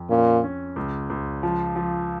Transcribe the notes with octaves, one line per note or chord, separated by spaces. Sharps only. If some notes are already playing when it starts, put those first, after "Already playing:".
Already playing: F2
A#2 C#4
C#4
C#2
C#2
F3
F3